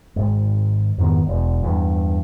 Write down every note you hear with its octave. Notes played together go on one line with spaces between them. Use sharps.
G#1 G#2
F2 G#2 D#3 B3
E1 E2
E2 G2